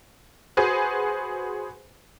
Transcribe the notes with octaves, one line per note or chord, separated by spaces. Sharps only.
F#4 G#4 B4 C5